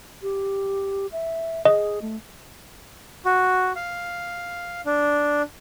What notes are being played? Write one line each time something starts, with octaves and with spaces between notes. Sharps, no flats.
G4
E5
G#4 D#5
A3
F#4
F5
D4